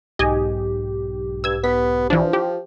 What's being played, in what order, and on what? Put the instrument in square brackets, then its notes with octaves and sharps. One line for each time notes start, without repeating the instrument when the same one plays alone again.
[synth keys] B1 G#2 G4 [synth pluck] D#5 G#5
[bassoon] G2 [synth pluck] E6 G#6
[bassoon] B3 [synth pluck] B6
[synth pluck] E3 D4 [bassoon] F3
[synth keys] F4 [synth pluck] G4